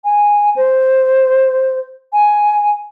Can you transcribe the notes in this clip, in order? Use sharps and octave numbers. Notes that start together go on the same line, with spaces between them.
G#5
C5
G#5